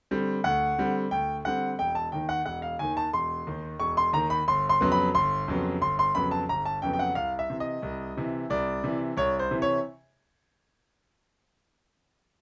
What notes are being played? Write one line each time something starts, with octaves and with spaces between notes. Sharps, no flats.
D3 G3 C4
D2 F#5
D3 G3 C4
D2 G5
D3 G3 C4 F#5
E1 G5
A5
D#2 D#3 G5
F#5
E1 F#5
F5
D#2 D#3 G#5
A5
E1 C6
D#2 D#3
E1 C#6
C6
D#2 D#3 A#5
B5
G1 C6
C6
F2 C#3 F#3 B3
B5
G1 C6
F2 C#3 F#3 B3
G1 C6
C6
F2 C#3 F#3 B3 B5
A5
G1 A#5
A5
F2 C#3 F#3 B3 G5
G5
F#5
C2 F5
E5
C3 E3
D#5
C2
C3 E3
C2 D5
C3 E3
C2 C#5
C5
C3 E3
C#5